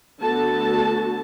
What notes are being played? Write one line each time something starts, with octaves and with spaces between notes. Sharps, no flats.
D3 A3 B3 F#4 A4 A5